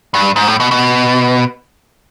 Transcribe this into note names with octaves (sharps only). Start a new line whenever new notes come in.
G2
G#2
A2
B2
B2